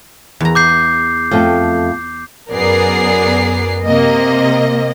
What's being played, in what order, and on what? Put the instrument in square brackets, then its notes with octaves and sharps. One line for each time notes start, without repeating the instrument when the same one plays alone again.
[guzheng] E2 A#5
[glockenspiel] D6 G6 C7
[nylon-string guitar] F2 A3 G5
[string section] F#2 B3 G#4 A#4 D5 C7
C3 A#3 D#5